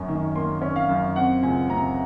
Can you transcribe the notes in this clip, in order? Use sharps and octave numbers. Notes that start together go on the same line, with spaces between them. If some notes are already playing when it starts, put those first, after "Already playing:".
Already playing: F#2 C#4 G#5
D#3
A#3 C6
C#4
F5
F#2
C4 F#5
C#2 G#5
C3 A#5